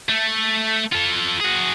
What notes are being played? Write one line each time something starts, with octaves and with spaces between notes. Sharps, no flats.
A3
F4 A4
F#4 G#4